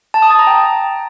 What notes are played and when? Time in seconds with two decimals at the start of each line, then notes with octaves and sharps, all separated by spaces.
0.14 A5
0.22 D#6
0.31 A6
0.39 A#5
0.47 G5